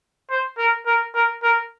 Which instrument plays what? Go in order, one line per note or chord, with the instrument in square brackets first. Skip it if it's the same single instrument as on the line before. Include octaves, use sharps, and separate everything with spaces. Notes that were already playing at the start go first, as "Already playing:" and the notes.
[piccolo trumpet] C5
A#4
A#4
A#4
A#4